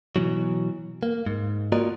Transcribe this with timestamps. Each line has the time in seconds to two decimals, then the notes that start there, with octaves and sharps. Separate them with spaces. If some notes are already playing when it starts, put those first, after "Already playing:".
0.16 B2 E3 F#3
1.03 A#3
1.26 G#2
1.72 A#3 F4 F#4 A#4 D5 D#5